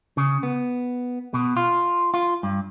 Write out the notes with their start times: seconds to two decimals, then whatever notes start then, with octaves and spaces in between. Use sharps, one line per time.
0.17 C#3
0.43 B3
1.34 B2
1.57 F4
2.14 F4
2.43 G2